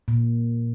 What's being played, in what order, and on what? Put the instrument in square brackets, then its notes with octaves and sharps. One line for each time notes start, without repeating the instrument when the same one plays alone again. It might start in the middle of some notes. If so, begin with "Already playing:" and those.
[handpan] A#2